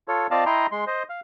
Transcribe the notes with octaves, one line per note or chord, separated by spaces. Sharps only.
F4 A4 C#5
C4 F4 D5 D#5 F5 A5
E4 D#5 G5 A#5 C6
G#3 C6
C5 D#5
F5